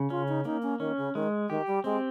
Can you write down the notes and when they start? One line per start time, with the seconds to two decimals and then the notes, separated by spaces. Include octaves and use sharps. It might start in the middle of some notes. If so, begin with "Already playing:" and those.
Already playing: C#3
0.10 C#4 F4
0.28 D#4
0.45 A#3 D#4
0.62 C#4
0.80 D#3 C#4
0.97 C#3
1.15 D#3 G#3
1.49 D#3 G4
1.67 G3
1.84 G#3 C4